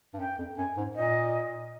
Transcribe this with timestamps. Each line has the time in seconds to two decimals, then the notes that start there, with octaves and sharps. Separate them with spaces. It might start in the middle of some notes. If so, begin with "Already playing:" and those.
0.14 G2
0.19 F#2 G5
0.38 F2
0.57 F#2 G#5
0.77 G#2
0.96 A#2 D#5